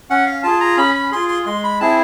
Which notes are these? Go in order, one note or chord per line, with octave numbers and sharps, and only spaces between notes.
C#4 F#5
F5
F4 G#4 A5
A#5
C#4 B5
B5
F4 G#4 C6
C6
G#3 C6
B5
C4 E4 G#4 A5